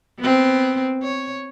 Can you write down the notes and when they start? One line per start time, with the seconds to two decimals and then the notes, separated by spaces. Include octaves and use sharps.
0.19 B3 C4
1.03 C#5